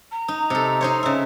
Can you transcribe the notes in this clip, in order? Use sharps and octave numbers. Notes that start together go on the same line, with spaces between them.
A#5
D#4
C3 A4
D#4 C5 C#5
C#3 E5